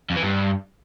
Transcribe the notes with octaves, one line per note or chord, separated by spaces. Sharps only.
F2
E3
G2